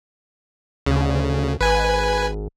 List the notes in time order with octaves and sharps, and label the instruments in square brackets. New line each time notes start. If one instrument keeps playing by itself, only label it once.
[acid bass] D2 [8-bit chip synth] C#3
[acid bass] G#1 [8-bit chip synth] B4 G#5